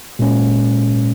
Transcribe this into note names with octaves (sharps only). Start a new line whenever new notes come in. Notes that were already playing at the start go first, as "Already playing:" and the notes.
A#2 G#3 C#4